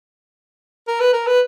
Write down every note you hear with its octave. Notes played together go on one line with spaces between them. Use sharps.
A#4
B4
A#4
B4